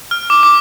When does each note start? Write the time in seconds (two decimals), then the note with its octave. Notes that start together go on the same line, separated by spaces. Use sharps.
0.11 F6
0.30 D6
0.43 D6